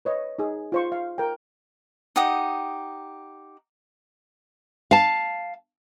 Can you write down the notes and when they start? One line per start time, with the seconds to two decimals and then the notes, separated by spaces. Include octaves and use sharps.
0.05 B4 C#5 D#5
0.39 D#4 G#4
0.72 F4 C5 C#6
0.92 F5
1.18 A#4 G5
2.16 D#4 G4 F#5 D#6
4.91 F5 A5